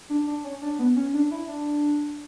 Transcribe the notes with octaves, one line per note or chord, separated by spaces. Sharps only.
D4
D4
C#4
D4
B3
C#4
D4
E4
D4